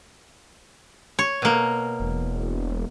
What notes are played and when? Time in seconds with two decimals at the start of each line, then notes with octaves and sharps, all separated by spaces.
1.19 C#5
1.42 B2 A#3
2.00 E1